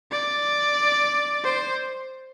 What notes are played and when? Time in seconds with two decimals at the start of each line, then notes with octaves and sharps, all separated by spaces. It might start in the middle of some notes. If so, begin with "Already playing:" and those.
0.11 D5
1.44 C5